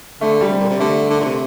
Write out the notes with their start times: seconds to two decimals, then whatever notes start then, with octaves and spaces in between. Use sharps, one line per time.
0.21 D3 A3
0.41 G3
0.51 C3
0.60 A#2
0.70 C3
0.80 D3 A3
1.10 D3
1.20 A#2
1.24 C3